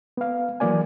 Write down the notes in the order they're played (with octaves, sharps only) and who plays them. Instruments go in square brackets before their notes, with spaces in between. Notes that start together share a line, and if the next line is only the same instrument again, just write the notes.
[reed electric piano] B3 F5
E3 F#3 A#3 D5 G#5